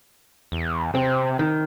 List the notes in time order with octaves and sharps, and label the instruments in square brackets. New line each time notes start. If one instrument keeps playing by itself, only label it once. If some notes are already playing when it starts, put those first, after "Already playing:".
[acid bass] E2
[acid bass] C3 [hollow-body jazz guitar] C4
[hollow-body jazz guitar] D#3